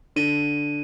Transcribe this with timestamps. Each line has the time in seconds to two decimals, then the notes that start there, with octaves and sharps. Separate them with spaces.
0.16 D3 D#7